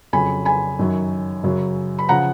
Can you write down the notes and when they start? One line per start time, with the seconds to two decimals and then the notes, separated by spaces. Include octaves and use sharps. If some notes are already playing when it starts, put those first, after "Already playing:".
0.13 F2 C#3 F#3 G#5 B5
0.45 G#5 B5
0.79 F#2 D#3 F#3
1.44 F#2 C#3 F#3
1.99 B5
2.09 C#3 F3 F#5 A#5